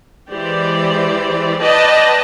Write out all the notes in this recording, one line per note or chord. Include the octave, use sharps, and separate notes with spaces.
E3 G#3 G4 C5 D5
B4 D5 D#5 G5 A5